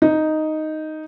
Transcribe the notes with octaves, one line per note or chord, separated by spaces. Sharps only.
D#4